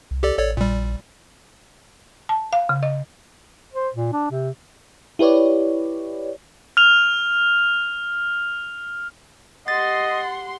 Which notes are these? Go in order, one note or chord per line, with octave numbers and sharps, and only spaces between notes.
C2
G4 A4 D5
A1 A4 C#5 D5
A#1 A#2 G3
A5
F5
C#3
D#5
C5
A#2
D4
C3
E4 G4 B4 C#5 D5
F6 F7
G4 D#5 F#5 C6 A6